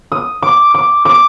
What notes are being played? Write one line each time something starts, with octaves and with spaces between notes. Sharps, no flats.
D#6
D6
D6
D6